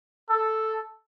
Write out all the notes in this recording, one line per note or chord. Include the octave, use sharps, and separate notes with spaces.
A4